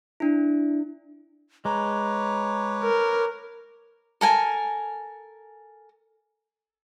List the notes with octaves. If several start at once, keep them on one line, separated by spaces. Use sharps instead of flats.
D4 E4
G#3 B4 C#5 A#5 D6
A#4
A4 A#4 G#5